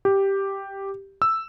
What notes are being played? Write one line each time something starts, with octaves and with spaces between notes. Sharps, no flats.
G4
E6